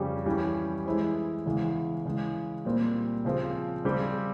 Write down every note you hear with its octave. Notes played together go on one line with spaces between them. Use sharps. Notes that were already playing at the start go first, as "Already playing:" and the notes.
Already playing: F2 C#3 G3 C#4 G4
E3 G3 C#4 G4
E3 G#3 E4 G#4 C5
E2 C#3 E3 G#3
C#3 E3 G#3
A#2 G3 C4
C#3 F3 C4
C#3 G3 C4 G4